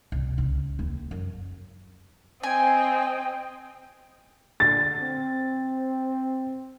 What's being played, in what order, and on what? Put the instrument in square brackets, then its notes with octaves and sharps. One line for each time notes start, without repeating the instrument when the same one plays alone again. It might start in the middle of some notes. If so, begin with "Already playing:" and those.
[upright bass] C2
C#2
D#2
F#2
[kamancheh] C4 D#5 [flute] G5 [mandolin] G#5
[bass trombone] D3 [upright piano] A6
[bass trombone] C4